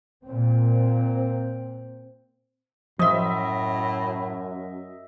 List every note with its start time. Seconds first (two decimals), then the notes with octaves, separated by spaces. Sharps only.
0.25 A#2 C4
2.99 F#2 A2 F3 D#5 E5 C6